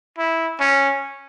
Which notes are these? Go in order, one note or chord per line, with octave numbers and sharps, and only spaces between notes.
E4
C#4